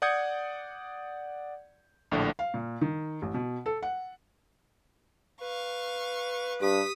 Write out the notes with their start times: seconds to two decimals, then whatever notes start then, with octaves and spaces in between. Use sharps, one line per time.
0.02 D5 F#5 D#6 G6 G#6 C#7
2.11 A#1 A2 D3
2.39 F5
2.54 A#2
2.81 D#3
3.22 A1
3.34 B2
3.66 A4
3.83 F#5
5.42 B4 F5 C#6
6.62 G2 G4 D#6 B6